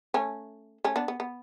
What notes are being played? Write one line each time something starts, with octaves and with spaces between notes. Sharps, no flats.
A3 C#4
A3 C#4
B3 D4
B3
B3